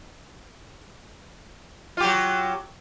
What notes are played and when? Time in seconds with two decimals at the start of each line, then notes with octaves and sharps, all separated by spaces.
1.97 F4
2.00 G4
2.04 F#3